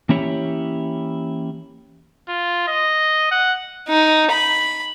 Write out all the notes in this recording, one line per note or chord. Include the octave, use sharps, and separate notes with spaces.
E3 A#3 C#4 E4 G4 C#5
F4
D#5
F#5
D#4
B5